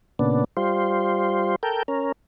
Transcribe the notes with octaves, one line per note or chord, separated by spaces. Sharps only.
A#2 C#3 B3 D4
G3 F4 C5
A4 A#4 G5
C#4 A#4